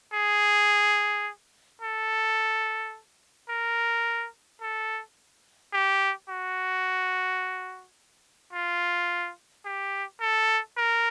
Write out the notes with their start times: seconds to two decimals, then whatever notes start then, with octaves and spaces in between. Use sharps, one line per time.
0.14 G#4
1.82 A4
3.49 A#4
4.62 A4
5.73 G4
6.29 F#4
8.53 F4
9.65 G4
10.21 A4
10.77 A#4